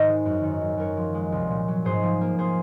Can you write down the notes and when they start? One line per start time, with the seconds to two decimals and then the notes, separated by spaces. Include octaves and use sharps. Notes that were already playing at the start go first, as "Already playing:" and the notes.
Already playing: G#2 D#3 C5 D#5
0.09 G#3
0.25 F#2
0.43 D#3
0.61 F#3
0.77 F#2 A#4 C#5
0.97 F3
1.14 G#3
1.32 C2
1.50 A#2
1.68 F#3
1.85 G#2 G#4 C5
2.03 F3
2.21 A#3
2.39 G#4 C5